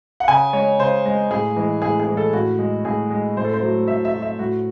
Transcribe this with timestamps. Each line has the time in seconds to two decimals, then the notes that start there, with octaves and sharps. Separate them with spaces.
0.20 F#5
0.28 C#3 G#5
0.53 G#3 C#5
0.79 C#3 C5
1.06 G#3
1.31 A2 G#4
1.56 E3 G#3
1.82 A2 G#4
2.00 G#4
2.07 E3 G#3
2.17 A4
2.33 A2 F#4
2.59 G#3
2.85 A2 G#4
3.10 G#3
3.37 A2 C5
3.44 A4
3.54 C5
3.62 F#3 A3
3.88 A2 E5
4.05 E5
4.13 F#3 A3
4.22 E5
4.39 A2 F#4